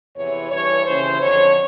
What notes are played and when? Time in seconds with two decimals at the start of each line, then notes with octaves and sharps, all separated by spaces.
0.16 E2 C3 E3 C#5
0.51 G2 E3 C#5
0.86 D#2 C#3 E3 C5
1.21 F2 D3 C#5